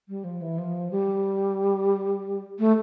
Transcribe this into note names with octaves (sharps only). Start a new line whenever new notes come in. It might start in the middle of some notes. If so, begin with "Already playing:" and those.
G3
F3
E3
F3
G3
A3